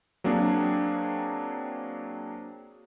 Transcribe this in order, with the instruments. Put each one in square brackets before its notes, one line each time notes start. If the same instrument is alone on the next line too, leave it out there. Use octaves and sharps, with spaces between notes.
[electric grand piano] F#3 A#3 C4 D4 G#4